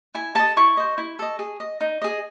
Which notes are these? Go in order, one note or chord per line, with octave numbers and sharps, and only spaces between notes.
E4 G#5
A4 D#5 A5
E4 C#6
C5 D#5
E4
A4 D#5
G#4
D#5
D#4
G#4 D#5